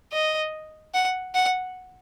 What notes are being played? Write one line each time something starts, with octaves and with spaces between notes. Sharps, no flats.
D#5
F#5
F#5